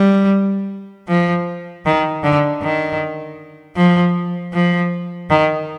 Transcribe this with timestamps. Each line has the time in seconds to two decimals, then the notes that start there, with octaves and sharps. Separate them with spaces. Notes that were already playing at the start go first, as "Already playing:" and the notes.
Already playing: G3
1.08 F3
1.85 D#3
2.23 D3
2.62 D#3
3.76 F3
4.53 F3
5.30 D#3